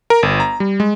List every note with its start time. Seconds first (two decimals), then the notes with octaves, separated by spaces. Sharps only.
0.10 A#4
0.23 G1
0.40 A#5
0.60 G3
0.80 G#3